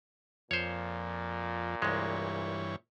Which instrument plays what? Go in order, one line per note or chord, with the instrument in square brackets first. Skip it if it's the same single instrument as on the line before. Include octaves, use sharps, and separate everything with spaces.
[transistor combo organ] F2 [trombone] A#2 [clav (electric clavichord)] C5 C#5
[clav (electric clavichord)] C2 G#3 [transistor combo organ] G2 E3 C#5